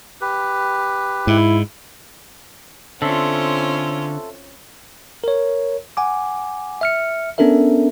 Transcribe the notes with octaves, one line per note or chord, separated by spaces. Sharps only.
G4 B4
G#2 E4
D3 C4 C#4 F4 A4 E5 C6
A#4 C#5
F#5 G#5 D6
E5 F6 C#7
B3 C#4 D4 A4 A#4 E5